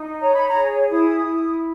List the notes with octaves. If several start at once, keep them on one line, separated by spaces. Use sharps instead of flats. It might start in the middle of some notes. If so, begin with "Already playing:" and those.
Already playing: D#4
C#5 A#5
B5
A#5
G#4
E4 D#6
E4